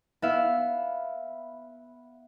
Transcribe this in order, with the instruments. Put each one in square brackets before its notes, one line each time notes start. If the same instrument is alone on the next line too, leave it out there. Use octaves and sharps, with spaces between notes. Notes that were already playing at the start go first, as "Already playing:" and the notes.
[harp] B3 E4 E5 F5